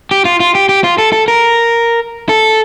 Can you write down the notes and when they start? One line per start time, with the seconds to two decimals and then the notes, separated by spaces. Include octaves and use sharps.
0.11 G4
0.25 F4
0.40 F4
0.55 G4
0.69 G4
0.84 F4
0.98 A4
1.13 A4
1.28 A#4
2.29 A4